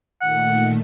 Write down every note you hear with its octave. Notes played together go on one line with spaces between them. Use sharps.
A#2 D#3 A3 F#5